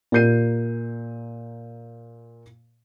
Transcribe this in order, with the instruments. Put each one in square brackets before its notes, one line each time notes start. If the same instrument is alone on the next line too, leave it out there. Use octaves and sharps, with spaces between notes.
[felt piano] A#2 G4 A#4 G6 C7 D#7